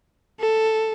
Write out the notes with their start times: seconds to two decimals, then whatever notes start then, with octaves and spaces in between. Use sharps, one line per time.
0.40 A4